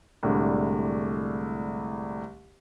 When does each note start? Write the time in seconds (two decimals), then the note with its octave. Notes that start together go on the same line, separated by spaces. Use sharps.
0.23 C2 A2 D3 G#3